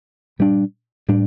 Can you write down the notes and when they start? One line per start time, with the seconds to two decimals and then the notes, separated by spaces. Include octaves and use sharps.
0.39 A#2 G3 D4
1.08 A2 G3 D4